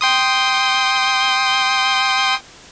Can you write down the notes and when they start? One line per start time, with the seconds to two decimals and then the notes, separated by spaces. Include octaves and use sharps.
0.01 G5 C6 D#6